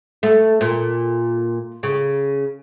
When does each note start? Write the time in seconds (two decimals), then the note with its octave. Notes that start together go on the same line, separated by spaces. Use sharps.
0.23 A3
0.61 A#2
1.83 C#3